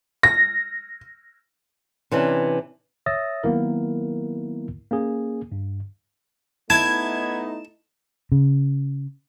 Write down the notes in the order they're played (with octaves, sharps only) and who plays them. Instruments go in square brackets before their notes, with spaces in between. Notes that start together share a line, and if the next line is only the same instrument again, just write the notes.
[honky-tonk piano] A#6
[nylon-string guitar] C3 E3 C#4 D4
[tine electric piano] C#5 E5 D#6 E6 A6 A#6
D#3 F#3 A#3 B3 E4 A#4
A#3 C#4 G#4
G2
[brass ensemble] A3 B3 D#4 [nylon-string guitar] E4 [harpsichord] A5 [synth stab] G#6
[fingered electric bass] C#3